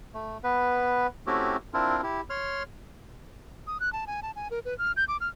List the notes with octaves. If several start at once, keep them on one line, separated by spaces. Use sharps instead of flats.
A3
B3 B4
A3 C4 C#4 E4 F#4 G4
C4 D4 E4 F4 A#4
E4 G4
C#5 C6 F6
D#6
F#6
A5
G#5
A5
G#5
A#4
B4
F6
G6
D6
F6